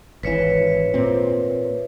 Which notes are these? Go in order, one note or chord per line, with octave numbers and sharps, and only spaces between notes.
G#1 E3 B4 C#5 E5
A#2 C4